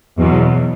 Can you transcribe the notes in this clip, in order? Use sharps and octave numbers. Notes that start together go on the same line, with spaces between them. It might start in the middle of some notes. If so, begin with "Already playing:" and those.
E2 B2 F#3